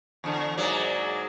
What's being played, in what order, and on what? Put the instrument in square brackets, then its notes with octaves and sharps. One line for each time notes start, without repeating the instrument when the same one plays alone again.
[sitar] E2 D3
[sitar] G#2 F#3 A#3 [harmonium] G#4 D5